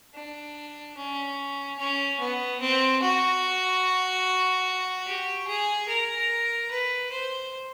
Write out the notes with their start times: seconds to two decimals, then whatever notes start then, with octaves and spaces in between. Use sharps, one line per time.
0.15 D4
0.97 C#4
1.79 C#4
2.20 B3
2.60 C4
3.02 F#4
5.07 G4
5.48 G#4
5.88 A#4
6.70 B4
7.11 C5